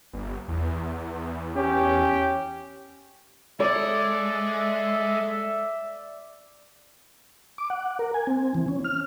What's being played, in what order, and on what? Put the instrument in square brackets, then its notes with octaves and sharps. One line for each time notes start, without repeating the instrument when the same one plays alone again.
[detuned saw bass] G1
E2
[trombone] C#4 [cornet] G4
[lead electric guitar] G#3 [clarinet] A4 [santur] D5 [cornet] E5
[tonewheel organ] D6
F#5
A#4
G#5
C4
E3
C#4
F6